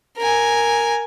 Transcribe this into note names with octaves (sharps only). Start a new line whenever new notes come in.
A#4 G#5